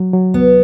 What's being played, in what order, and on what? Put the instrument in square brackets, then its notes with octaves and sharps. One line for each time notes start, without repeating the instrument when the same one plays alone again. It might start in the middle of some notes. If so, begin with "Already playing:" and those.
Already playing: [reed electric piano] F#3
F#3
[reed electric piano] C2 [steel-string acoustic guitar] B3